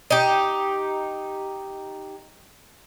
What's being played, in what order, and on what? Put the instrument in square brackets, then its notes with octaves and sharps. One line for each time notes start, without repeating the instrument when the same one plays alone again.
[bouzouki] D#4 G4